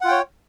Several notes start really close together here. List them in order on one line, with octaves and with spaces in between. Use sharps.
F#5 F4 G5 C#5